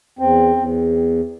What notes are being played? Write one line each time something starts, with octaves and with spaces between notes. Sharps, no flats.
E2 C4
E2